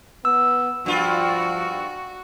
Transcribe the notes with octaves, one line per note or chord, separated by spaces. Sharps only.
B3 E6
G2 F3 F4 F#4